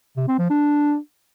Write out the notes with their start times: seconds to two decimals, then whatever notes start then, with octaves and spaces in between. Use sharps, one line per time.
0.17 C3
0.28 C4
0.39 F3
0.50 D4